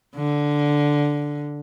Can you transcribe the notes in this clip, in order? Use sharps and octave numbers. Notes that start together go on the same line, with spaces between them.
D3